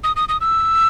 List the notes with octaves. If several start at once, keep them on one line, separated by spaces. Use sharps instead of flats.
D#6
D#6
D#6
E6